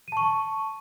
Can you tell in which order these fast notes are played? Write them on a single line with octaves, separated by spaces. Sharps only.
D#7 A5 C#6